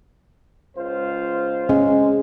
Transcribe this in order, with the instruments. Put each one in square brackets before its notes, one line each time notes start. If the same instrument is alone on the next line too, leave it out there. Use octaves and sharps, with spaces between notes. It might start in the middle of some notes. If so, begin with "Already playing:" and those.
[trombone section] C#2 F4 C5
[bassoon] G#3 [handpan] C#4